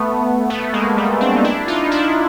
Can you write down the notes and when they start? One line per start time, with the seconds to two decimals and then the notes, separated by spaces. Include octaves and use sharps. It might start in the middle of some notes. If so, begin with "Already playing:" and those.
Already playing: A3 B3
0.50 A3 B3
0.73 G#3 A#3
0.97 G3 A3
1.21 C4 D4
1.36 D#4
1.44 D4 E4
1.68 D#4 F4
1.91 D4 E4